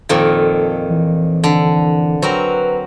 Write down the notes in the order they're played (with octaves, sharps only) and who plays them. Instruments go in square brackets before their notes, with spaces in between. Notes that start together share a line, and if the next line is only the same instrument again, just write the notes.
[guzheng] F2 A#2 D#3 [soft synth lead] A4
[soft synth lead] E3
[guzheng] D3
[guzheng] F#3 C4 A#4 [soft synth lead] B4